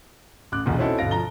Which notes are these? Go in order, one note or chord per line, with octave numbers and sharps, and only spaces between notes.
A1 D6 F#6
F#1 B1 E2 A#2
C4 C#4 D#4 E4 F#4 A4
G1 B2 A4 F5 A#6 D7
F3 A#5 A#6 G7